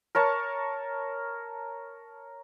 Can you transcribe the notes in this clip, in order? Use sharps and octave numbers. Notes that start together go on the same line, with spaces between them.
A#4 C#5 A5 C#6